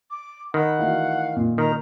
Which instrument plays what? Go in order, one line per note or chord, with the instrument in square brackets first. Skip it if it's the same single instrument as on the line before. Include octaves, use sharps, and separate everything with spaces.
[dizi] D6
[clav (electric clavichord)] D#3 [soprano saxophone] F#5 [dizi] B5
[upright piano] E3 A3 F#4 [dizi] F5
[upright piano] A#2
[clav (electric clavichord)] D#3 [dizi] A#5